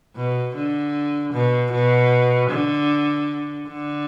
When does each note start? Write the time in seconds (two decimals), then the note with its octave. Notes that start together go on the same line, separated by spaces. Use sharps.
0.16 B2
0.55 D3
1.34 B2
1.72 B2
2.51 D3
3.68 D3